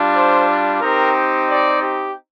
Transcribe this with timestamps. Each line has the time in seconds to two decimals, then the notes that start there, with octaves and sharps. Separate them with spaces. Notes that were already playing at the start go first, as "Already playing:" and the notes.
Already playing: G3 D4 F4
0.16 C5
0.81 C4 D#4 G4 A#4
1.49 D5
1.82 G4